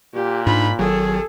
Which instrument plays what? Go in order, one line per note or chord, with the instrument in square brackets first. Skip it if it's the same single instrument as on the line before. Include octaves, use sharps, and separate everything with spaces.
[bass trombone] A#2 [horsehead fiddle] G4
[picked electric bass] G#2 [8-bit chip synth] D4 D#4 F4 [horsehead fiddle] B5
[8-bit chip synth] G#1 D#3 [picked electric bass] F#3 [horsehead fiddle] G#4 A4